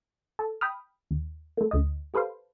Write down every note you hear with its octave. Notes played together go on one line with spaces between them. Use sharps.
A4
G5 B5 D#6 F6
D#2
A3 A#3
D2 D#5
G4 A4 B4 C5 F5